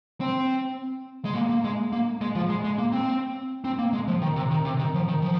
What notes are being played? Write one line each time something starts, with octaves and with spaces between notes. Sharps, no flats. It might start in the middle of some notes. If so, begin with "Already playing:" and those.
C4
G#3
A#3
A#3
G#3
A#3
G#3
F3
G#3
G#3
A#3
C4
C4
A#3
G#3
F3
D#3
C3
D#3
C3
D#3
F3
D#3
F3